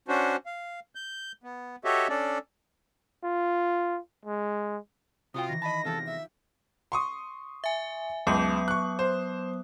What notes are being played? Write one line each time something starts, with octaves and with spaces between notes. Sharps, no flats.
C#4 D4 F#4 C5
F5
G6
B3
F#4 G4 A4 C#5 D#5 E5
C#4 D4 A4 D5
F4
G#3
C3 F4 F#4 G5 D#6
D#3 E3 A#6
D#5 A5 B5
E2 G#2 C3 F4 G4 A4
E5
C6 C#6 D#6
E5 G#5
C#2 F#3 B3 D#6
C#6 F#6
C5